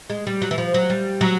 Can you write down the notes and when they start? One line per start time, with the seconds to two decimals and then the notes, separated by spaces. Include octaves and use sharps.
0.10 G#3
0.27 G3
0.42 F#3
0.51 E3
0.58 F3
0.74 F#3
0.90 G3
1.21 F#3